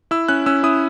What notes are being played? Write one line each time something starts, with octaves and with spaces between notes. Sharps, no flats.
E4 E6
C#4 F#6
C#4 E6
E4 D#6